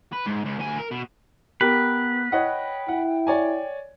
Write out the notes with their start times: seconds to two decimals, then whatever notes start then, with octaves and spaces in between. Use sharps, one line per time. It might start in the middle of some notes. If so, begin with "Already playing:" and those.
0.13 B4
0.26 G#2
0.45 C#2
0.59 D2 G#5
0.78 A#4
0.91 B2
1.61 B3 G4 A#4 B4
2.32 C#5 D#5 F#5 G5
2.88 E4 F#5
3.27 C#5 D5 G#5